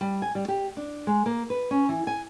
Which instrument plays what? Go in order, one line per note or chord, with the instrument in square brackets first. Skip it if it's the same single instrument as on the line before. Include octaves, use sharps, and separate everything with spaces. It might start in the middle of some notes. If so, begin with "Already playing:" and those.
[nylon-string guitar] G3
G#5
G3
G4
D4
G#3
A#3
B4
C#4
E3
G#5